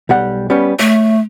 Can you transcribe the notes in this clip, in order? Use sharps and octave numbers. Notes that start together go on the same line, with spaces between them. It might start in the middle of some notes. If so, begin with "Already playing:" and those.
B1 G3 F#5
G3 B3 C#4
A3 C#5